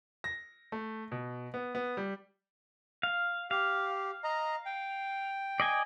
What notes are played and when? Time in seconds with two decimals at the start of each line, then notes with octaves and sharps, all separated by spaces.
0.24 A#6
0.72 A3
1.12 B2
1.54 B3
1.75 B3
1.97 G3
3.03 F5
3.51 G4 F5
4.24 D#5 A#5
4.66 G5
5.60 D5 D#5 G#5